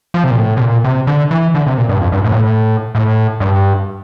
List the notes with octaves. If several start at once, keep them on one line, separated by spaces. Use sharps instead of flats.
F3
C3
A#2
A2
C3
A#2
C3
D3
E3
D3
C3
A#2
G2
F2
G2
A2
A#2
A2
A2
G2